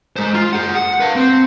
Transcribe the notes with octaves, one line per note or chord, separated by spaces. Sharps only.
G#3 C5
F4
G#4 F#5
F#5
B4 F5
C4